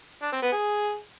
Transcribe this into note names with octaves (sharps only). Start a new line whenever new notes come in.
D4
C4
B3
G#4